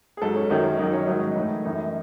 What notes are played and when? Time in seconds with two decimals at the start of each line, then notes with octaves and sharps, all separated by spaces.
0.17 G#4
0.22 G#2 F#3 A4
0.36 C#4
0.50 F#2 D#3 F#3 C#4
0.79 F#2 D#3 F#3 D#4
0.93 C#4
1.07 G#2 D#3 F#3 D#4
1.36 A2 E3
1.65 F#2 E3 D#4